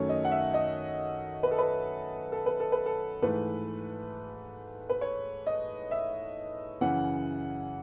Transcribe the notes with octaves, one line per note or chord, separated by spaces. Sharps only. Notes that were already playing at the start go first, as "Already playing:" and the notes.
Already playing: F#2 D#3 F#3 A3 C#5
D#5
F#5
E5
D#5
B4
A4
B4
A4
B4
A4
B4
A4
G#2 E3 A3 B4
B4
C#5
D#5
E5
F#2 C#3 E3 F#5